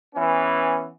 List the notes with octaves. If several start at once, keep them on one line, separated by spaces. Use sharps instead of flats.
E3 B3 C#4